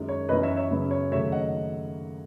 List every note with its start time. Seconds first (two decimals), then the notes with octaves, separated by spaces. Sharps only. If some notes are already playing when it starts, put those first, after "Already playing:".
Already playing: F#2 D#3 G#3
0.09 C#5
0.29 F#2 E3 B3 B4 D#5
0.43 C#5 E5
0.56 C#5 E5
0.70 F#2 C#3 F#3 B3
0.91 C#5
1.11 D#2 C#3 F#3 A3 C#5 E5
1.32 D#5 F#5